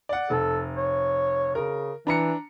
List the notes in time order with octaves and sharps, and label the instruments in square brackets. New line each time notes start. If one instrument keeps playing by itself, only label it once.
[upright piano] D5 F#5
[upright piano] F1 [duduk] A4
[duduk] C#5
[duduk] C#3 [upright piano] A#4
[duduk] E3 [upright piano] D4 A#5 C#7